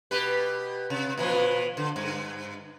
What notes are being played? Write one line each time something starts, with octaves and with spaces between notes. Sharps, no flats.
B2 G4 B4
C3
A#2 E3 F3
D3
G2